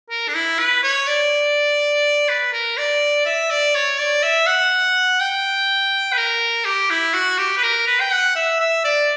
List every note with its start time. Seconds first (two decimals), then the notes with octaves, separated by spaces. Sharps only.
0.10 A#4
0.28 D4
0.35 E4
0.59 B4
0.83 C#5
1.07 D5
2.29 B4
2.53 A#4
2.77 D5
3.26 E5
3.50 D5
3.75 C#5
3.98 D5
4.23 E5
4.47 F#5
5.20 G5
6.12 B4
6.17 A#4
6.65 G4
6.90 E4
7.14 F#4
7.38 G4
7.57 B4
7.63 A#4
7.87 B4
8.00 G5
8.12 F#5
8.36 E5
8.60 E5
8.84 D5